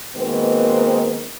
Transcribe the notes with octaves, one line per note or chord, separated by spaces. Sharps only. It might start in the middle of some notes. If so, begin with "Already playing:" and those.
B2 D#3 G#3 A#3 C4 B4